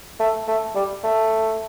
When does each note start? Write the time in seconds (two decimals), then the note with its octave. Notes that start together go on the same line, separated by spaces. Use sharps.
0.20 A3
0.48 A3
0.75 G3
1.04 A3